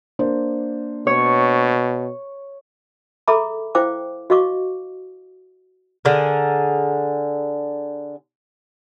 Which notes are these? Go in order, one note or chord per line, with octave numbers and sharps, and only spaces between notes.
A#3 D4 C5
B2 C#5
G#4 A4 E5 A#5 B5 D6
E4 C5 F5 G5 D6
F#4 D#5 F5 C#6 D6
D3 G#4 A#4